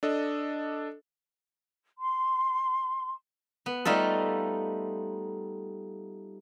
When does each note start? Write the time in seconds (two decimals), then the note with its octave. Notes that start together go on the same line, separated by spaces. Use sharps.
0.03 D4 A4 D#5
1.99 C6
3.66 B3
3.85 G3 A3 D#4 F4 A4